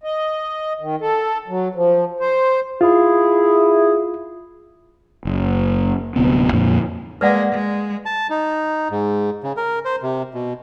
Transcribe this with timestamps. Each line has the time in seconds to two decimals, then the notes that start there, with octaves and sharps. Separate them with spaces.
0.03 D#5
0.80 D#3
1.01 A4
1.48 F#3
1.75 F3
2.20 C5
2.81 E4 F4 G#4
5.25 F#1
6.16 D1 G2 C3 B3
6.53 F2 A#2 D3
7.21 G#3 A#3 B4 D5 F#5
7.53 G#3
8.06 A5
8.30 D#4
8.91 G#2
9.43 C#3
9.57 A#4
9.85 C5
10.02 C3
10.34 B2